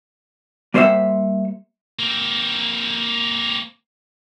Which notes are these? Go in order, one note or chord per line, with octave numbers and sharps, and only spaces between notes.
G3 A#3 C5 C#5 E5 F#5
A#3 C4